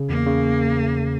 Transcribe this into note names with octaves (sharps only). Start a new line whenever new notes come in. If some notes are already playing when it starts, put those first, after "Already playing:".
Already playing: C#3
E2 A#3
C#3